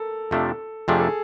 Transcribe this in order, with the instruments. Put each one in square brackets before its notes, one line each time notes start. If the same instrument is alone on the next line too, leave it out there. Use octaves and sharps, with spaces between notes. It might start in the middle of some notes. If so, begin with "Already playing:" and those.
Already playing: [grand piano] A4 A#4
[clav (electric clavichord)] F2 C3 F3 A3 D4
[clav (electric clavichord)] F2 C3 F3 A3 D4 [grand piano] G#4
[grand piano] A4